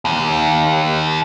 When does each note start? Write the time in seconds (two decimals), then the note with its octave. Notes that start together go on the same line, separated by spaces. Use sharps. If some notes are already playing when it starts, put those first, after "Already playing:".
0.05 D#2